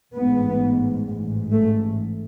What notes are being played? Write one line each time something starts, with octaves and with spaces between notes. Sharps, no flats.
A1 G#2 B3
A1 G#2
A3